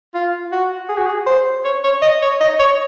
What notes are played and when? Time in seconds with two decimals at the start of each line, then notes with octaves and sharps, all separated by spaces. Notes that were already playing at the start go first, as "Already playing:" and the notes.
0.15 F4
0.52 F#4
0.89 G#4
0.98 F#4
1.06 G#4
1.27 C5
1.65 C#5
1.84 C#5
2.02 D#5
2.22 C#5
2.40 D#5
2.59 C#5